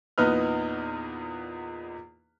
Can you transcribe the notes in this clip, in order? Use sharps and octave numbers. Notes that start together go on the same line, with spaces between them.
E2 A#2 B3 D#4 B4 F6